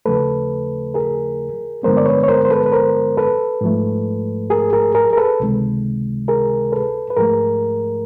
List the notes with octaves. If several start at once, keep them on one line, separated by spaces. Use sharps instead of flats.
D#2 C#3 F3 A3 A4 B4
G#4 A#4
G2 D3 F3 G#3 B3 A#4 C5
D5
B4 C#5
C#5
A#4 C5
C5
A4 B4
B4
A#4 C5
A4 B4
G#2 F3 A3
G#4 A#4
G#4 A#4
G#4 A#4
A#4
A4 B4
C#2 C3 D#3 G#3
G#4 A#4
A4 B4
B4
G#2 F3 A3 G#4 A#4